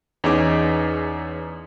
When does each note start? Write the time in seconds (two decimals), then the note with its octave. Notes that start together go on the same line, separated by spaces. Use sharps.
0.24 E2 C#4 D#4 G#4 D6